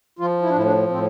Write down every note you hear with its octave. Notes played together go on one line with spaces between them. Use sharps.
F3 F4
E4
D4
A2 E4
D4
A2 C4